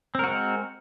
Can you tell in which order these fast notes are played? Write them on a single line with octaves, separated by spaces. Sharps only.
C4 A#4 F#4 G#3